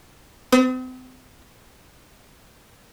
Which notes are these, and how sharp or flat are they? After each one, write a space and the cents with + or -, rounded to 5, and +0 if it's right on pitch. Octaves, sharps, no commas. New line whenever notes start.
C4 -40 C5 -35 D#6 +0